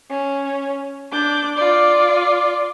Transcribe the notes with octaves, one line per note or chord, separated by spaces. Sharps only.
C#4
D4 D6 G6
F4 D5